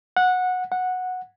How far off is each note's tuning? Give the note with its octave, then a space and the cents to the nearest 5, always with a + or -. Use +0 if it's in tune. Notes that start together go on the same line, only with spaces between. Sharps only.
F#5 -15
F#5 -10